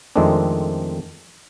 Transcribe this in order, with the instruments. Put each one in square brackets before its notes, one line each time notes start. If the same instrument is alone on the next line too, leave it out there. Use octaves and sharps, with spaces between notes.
[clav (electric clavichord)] F2 D#3 G#3 A3 C4 D4